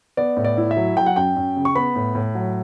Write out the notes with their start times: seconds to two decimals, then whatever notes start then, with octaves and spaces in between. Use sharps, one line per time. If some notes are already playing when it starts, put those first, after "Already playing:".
0.17 B3 D5
0.37 A2
0.44 D5
0.57 E4
0.71 E5
0.77 F#3
0.97 F#3 G5
1.06 F#5
1.16 F#2 G5
1.36 F#2
1.56 C#3
1.65 C#6
1.76 B3 B5
1.95 A2
2.15 A2
2.35 F#3